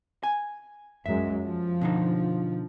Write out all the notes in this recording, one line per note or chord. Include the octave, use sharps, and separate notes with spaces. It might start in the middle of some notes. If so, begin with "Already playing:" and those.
G#5
F#2 F#3 G#3 E5
F3
B2 D3 D#4